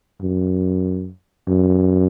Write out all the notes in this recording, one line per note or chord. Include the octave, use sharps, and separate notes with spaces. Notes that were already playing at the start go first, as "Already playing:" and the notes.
F#2
F#2